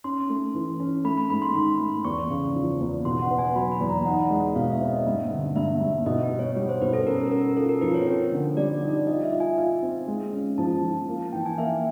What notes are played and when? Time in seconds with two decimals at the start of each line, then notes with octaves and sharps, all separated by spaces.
0.04 C#4 C6
0.30 A3
0.54 E3
0.80 C#4
1.04 A3 B5
1.17 B5
1.30 G#2 B5
1.42 C6
1.54 D#3 C6
1.80 A3
2.05 E2 C#6
2.30 C#3
2.55 F3
2.80 E2
3.05 B2 C6
3.22 F#5
3.30 B3
3.38 G#5
3.55 F#3 B5
3.72 B5
3.81 E2
3.89 A#5
4.06 D#4 F#5
4.30 G#3
4.55 B2 F5
4.72 E5
4.80 C4
4.89 D#5
5.06 G2
5.31 D3
5.56 G2 E5
5.81 G2
6.06 B2 D#5
6.23 B4
6.31 G3
6.39 C#5
6.56 G3 C#5
6.69 C5
6.81 B2 B4
6.93 A4
7.06 C#4 A#4
7.31 C#4 A#4
7.57 F4 A4
7.69 A#4
7.81 F3 B4
7.94 C#5
8.07 C4
8.32 D3
8.57 G3 D5
8.82 D#4
9.07 F4 D#5
9.24 E5
9.32 F4
9.40 G#5
9.57 F4
9.82 C4
10.08 G#3
10.32 C#4
10.58 F3 A5
10.83 F3
11.08 A#3
11.20 A5
11.33 E3 G5
11.46 G#5
11.58 A#3 E5